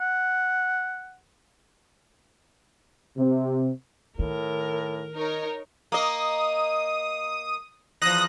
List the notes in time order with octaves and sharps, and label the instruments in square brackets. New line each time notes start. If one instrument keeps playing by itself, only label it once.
[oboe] F#5
[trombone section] C3
[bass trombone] A2 [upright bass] D#3 [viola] A#4
[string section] D#4 A#4 C#5
[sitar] A#3 D#5 [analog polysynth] D#6
[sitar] E2 F3 [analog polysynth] D#6 F#6 A#6